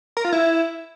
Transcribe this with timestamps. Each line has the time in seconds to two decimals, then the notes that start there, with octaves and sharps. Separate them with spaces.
0.17 A#4
0.25 F4
0.33 E4